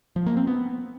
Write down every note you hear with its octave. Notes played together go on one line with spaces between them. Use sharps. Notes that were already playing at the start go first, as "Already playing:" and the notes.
F3
A#3
C4
B3